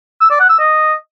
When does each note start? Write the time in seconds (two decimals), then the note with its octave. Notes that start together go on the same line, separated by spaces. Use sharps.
0.21 E6
0.30 D5
0.40 F#5
0.50 E6
0.59 D#5